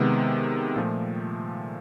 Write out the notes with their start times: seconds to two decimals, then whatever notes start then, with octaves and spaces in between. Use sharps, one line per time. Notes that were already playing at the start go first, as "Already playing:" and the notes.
Already playing: C3 D#3 G#3 B3
0.76 A#2 F3 A3